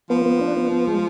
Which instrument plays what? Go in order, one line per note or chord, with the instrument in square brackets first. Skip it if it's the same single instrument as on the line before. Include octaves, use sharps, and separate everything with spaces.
[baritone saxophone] F3 [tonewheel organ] B3
[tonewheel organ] B3
D4
B3
B3
G#3